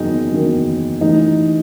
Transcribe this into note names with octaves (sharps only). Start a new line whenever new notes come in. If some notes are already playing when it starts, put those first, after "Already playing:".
Already playing: F#1 E2 D#3 F#3 D#4
F#1 E2 D#3 F#3
A1 A2 E3 D#4